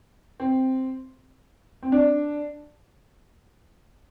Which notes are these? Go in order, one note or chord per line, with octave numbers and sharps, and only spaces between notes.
C4
C4
D4